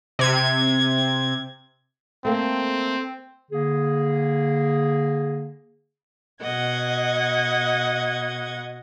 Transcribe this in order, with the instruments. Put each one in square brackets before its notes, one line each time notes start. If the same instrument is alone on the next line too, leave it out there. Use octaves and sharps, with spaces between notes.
[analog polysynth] C3 G#6
[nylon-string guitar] A3 A#3 [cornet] C4
[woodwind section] D3 A#3 G#4
[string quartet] B2 D#5 F#5 G#6